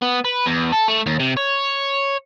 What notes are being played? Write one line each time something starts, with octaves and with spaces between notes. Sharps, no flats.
B3
B4
E2
A4
A3
D#2
C3
C#5